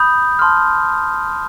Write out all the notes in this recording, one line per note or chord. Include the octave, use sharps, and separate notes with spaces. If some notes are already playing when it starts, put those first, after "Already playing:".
Already playing: B5 D#6 G6
A5 C6 F6